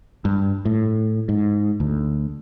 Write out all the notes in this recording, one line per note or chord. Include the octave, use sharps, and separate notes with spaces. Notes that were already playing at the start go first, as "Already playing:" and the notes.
G2
A2
G#2
D2